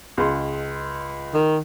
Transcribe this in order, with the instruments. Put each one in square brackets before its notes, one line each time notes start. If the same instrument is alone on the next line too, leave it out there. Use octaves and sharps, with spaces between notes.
[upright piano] C#2 G#3 C6
[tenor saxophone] D#3